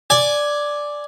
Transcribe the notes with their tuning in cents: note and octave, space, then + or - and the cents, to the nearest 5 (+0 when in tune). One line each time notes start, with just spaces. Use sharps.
D5 +0 G#5 +10